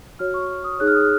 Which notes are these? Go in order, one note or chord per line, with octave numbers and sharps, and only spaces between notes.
F#4 C#5 F6
C#6
D#6
D#4 G#4 C#5 F#6
F6
D#6
F6